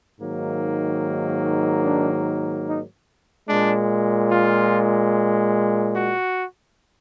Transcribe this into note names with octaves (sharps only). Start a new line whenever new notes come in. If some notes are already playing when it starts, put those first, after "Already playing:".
G#2 D#3 F#3 A#3
D4
D#4
A#2 G#3 D4
F4
F#4